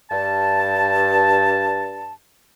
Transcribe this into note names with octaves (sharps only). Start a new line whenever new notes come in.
G2 A5